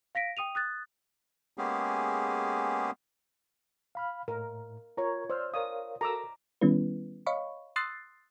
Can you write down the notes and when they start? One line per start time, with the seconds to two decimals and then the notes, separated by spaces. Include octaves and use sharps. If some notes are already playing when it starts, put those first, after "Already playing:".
0.15 F5 A#6 B6 D7
0.37 G5 D#6 D#7 F7
0.55 D#6 F#6 A6
1.57 G#3 A#3 B3 C#4 G4 G#4
3.95 F5 B5 F6
4.28 A2 A#4
4.97 F4 A#4 C#5 A#5 C#6
5.30 C5 D5 E6 F6
5.54 A#4 C#5 D5 F5 D#6
6.01 F#4 A4 A#4 A#5 D6 E6
6.61 D#3 G3 B3 C#4 E4 B4
7.26 C#5 D#5 F5 B5 C#6
7.76 C6 D#6 E6 F#6 A6 C7